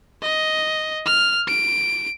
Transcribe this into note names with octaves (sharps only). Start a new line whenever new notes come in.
D#5
F6
D7